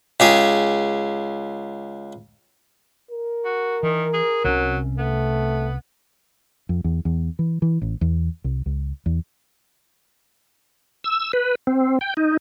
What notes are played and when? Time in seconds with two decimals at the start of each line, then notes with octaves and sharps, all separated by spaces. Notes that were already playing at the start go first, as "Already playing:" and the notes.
0.20 C#2 G4 G#4
3.11 A#4
3.45 F#4
3.83 D#3 E3
4.14 G#4
4.44 C2 C3 F#3 C#4
4.98 A3 B3
6.69 F2
6.84 E2
7.05 E2
7.39 E3
7.62 E3
7.82 A1
8.01 E2
8.44 C2
8.66 C#2
9.06 E2
11.04 E6
11.33 B4
11.67 C4
12.01 G5
12.17 D#4